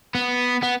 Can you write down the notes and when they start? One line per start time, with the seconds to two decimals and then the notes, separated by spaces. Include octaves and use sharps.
0.15 B3
0.62 B3